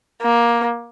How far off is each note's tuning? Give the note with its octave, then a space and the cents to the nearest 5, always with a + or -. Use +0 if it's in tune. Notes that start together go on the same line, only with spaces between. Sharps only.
A#3 +15